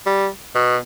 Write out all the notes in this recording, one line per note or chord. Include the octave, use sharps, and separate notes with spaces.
G3
B2